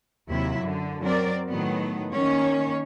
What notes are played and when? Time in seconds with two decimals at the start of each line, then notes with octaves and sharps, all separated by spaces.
0.29 D#2 C3 F#3 E4 E5
0.60 F#2 D3
1.02 F#3 C4 A#4 D5
1.49 A2 D#3 F#3 B3
2.12 D#3 A#3 C#4 C#5